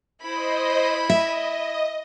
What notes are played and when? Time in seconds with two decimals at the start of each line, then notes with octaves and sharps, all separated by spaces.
0.22 E4 C5 D#5 B5
1.10 D#5 E5